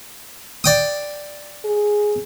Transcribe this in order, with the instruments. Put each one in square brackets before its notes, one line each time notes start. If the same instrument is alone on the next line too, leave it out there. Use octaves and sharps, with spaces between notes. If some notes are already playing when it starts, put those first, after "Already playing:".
[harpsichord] D5 G5 D#6
[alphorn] G#4